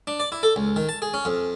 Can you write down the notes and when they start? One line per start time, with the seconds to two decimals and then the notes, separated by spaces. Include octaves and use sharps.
0.07 D4
0.20 D5
0.32 E4
0.43 A4
0.56 C#2
0.76 D#3
0.89 A5
1.02 G#4
1.14 C#4
1.25 F2